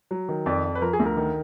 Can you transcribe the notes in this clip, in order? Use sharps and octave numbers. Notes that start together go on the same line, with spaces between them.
F#3
D#3
F2 D5
F2
B4
F3 A#4
G#4
D2
A#4
D#3